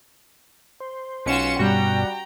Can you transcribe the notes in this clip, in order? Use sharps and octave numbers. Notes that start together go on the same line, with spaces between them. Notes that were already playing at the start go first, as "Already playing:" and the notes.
C5
B1 C#4 F4 F#4 C#7 E7
G2 B2 G3 F#4 G5 A#5